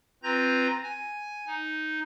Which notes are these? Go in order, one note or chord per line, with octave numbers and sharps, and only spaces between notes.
C4 F4 B4 A#5 G6 A#6
G#5
D#4